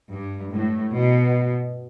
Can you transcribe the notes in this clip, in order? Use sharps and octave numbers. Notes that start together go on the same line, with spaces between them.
G2
A2
B2